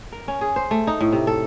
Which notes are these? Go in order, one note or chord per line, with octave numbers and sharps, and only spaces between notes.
A#4
C#4
G#4
C5
A3
D#4
A2
C3
A4